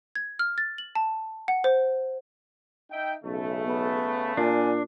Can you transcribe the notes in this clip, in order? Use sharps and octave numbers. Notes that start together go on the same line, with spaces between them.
G#6
F6
A6
F#7
A5
F#5
C5
D#4 E5 G5
B1 C#3 A3
B3
A#2 D4 G#5